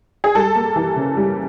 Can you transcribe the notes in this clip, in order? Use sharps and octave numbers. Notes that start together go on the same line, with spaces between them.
G#4
G3 A4
A#3
E3
C#3
G3